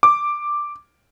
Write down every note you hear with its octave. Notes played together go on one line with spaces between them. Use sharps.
D6